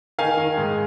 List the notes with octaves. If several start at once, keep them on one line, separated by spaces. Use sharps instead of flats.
D#3 F5 G#5
D#3
G#2